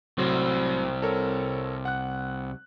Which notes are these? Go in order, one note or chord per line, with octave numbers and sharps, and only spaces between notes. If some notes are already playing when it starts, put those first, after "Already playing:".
C2 A2 F#3 C4
A4 A#4 C#5
F#5 F#6